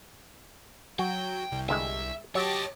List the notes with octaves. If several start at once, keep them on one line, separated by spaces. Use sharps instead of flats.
F#3 F#4 G5
C2
G1 G2 G#3 E5
F#3 G4 C#5 D#5 A5 D6